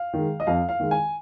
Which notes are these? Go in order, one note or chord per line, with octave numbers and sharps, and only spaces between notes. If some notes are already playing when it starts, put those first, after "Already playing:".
Already playing: F5
D#3 G#3
D#5
F2 F5
F5
D#3 G#3
G#5